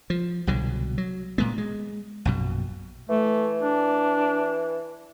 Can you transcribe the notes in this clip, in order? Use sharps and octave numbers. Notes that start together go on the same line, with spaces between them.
F3
C2 B2 D3 F#3
F#3
A#2 G#3 B3
G#3
A#1 F#2 B2
E3 A3
D4